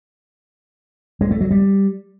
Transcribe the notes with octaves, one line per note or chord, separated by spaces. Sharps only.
G#3
A3
F#3
G3